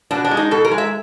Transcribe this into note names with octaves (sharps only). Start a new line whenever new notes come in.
B2 D4
D4
G#3
D#4
B2 A4
A#4
G#3
E5